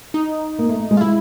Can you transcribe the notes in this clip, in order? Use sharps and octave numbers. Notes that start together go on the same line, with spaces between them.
D#4
A#3
A3
A3
G#3
F4
G#3 E4